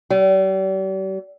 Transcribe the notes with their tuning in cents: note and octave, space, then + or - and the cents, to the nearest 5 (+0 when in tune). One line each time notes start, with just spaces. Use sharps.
G3 -40